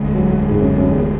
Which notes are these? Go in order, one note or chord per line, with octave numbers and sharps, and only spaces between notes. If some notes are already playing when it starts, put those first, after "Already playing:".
Already playing: E1 D2 D3 G#3
F#3
G#2
F#2
F#2
E2